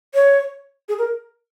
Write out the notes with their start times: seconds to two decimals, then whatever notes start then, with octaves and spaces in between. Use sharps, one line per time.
0.15 C#5
0.89 G#4
0.99 A#4